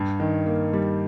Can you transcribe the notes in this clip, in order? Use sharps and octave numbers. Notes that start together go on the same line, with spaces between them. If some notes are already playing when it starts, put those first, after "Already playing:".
Already playing: G2
D#3
A#3
G3